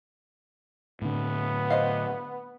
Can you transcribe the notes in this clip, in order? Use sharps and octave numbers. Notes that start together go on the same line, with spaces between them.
A2 D3 B3
C5 D#5 F5